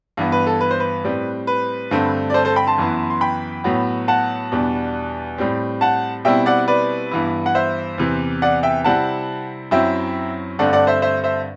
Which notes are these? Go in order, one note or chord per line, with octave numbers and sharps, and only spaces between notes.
G2 E3 B3
B4
A4
B4
C5
B4
A2 G3 C4
B4
G2 D3 A3 C4
D5
A4 C5
A4 C5
G5 B5
A5 C6
F#2 E3 B3 E4
C6
G5 B5
A2 F#3 B3
F#5 A5
E2 B2 G3 D4
A2 G3 C4
F#5 A5
B2 G3 C4 E4 E5 G5
D5 F#5
B4 D5
G2 E3 B3 E4
F#5
C5 E5
E2 C3 E3
D5 F#5
E5 G5
C3 G3 C4 E4 F#5 A5
F#2 F#3 C4 E4 E5 G5
G2 D3 A3 C4 D5 F#5
D5 F#5
C5 E5
C5 E5
C5 E5